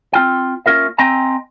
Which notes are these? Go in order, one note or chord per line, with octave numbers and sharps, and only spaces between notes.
C4 F4 G5
A#3 C#4 F4 A#4 E5
C4 D#5 G5 G#5 A#5